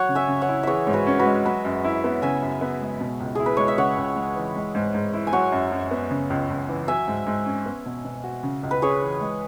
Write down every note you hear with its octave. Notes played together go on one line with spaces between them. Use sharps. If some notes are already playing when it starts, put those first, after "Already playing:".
Already playing: F#3 C#5 F#5
C#3
E5 G#5
C#3
C#5 F#5
E4
E3 G#4 C#5 E5
G#2 C#5
F#4 B4
C#4 C#5
F#4 B4
G#3
F#3 B4 E5
F#2
E4
B3
C#3 E5 G#5
F#2
B3
G#3
B2
C#2
E4 G#4
B4
G#3 C#5
E5
C#3 C#5 F#5
C#2
G#3
E3
G#3
G#2
G#2
E4
G#5
F#3 C#5 F#5
F#2
F#2
B3
C#3
C#2
C#2
E3
F#3 E5 G#5
G#2
G#2
C#4
B3
B2
B2
F#4
C#3
C#2
B4
C#4 G#4 C#5
E3
G#3